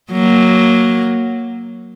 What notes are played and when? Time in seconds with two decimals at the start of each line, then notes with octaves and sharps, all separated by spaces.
0.12 F#3 A#3